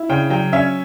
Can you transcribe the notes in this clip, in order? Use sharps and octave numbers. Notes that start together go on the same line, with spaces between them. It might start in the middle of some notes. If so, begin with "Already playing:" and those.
Already playing: E4
C#3 G5
F#3 G5
C#4 E5